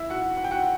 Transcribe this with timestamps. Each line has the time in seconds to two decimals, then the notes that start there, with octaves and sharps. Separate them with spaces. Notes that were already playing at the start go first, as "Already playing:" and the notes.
Already playing: E4 E5
0.10 F#4 F#5
0.37 F#5
0.44 G5
0.51 F#4 F#5